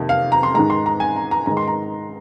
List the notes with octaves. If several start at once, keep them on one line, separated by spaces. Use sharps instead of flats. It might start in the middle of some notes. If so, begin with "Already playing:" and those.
Already playing: F2 C3 D#3 A#3
F5
A#5
C6
G#2 D#3 G#3 A#5
C6
A#5
G#5
A#5
A#5
G#2 D#3 G#3 A#5
C6
A#5